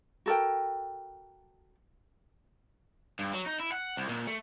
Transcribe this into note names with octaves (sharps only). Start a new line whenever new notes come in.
F#4 A4 A#4 G5
G2
F#3
D#4
E4
F#5
C2
A#2
A3